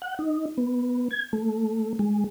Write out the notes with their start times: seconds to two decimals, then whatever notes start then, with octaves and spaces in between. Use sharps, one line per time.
0.02 F#5
0.19 D#4
0.58 B3
1.11 G#6
1.33 A3
1.99 G#3